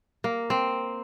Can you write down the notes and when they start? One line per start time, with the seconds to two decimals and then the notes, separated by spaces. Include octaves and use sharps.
0.24 A#3
0.50 C4